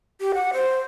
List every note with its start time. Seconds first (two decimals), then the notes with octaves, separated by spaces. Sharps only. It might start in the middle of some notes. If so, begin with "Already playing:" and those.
0.21 G4
0.34 F#5
0.53 C5